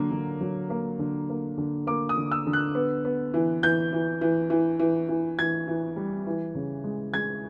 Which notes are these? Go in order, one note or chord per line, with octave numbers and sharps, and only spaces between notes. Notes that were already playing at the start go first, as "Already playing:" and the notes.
Already playing: D3 F#3 A#3
D3
F#3
A#3
D3
A#3
D3
A#3 D6
D#6
D3
E6
D3
F#6
B3
B3
E3
E3 G6
E3
E3
E3
E3
E3
E3 G#6
E3
G3
E3
C#3
G#3
G#3 G#6